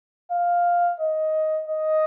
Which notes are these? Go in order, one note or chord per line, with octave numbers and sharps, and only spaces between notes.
F5
D#5
D#5